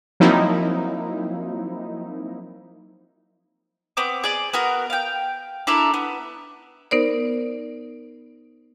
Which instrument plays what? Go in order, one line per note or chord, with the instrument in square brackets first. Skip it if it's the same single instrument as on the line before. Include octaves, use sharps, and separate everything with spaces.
[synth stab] F3 F#3 A#3 C4 D#4 E4
[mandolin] B3 C4 D6
G#4 D5
B3 F#4 A#4
F5 G5
D4 E4 A4 A#4
B3
[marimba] B3 D#4 A#4 C5 D5